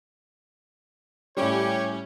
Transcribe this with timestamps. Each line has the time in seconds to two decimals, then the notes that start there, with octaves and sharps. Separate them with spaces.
1.37 A2 G3 C#4 G4 C#5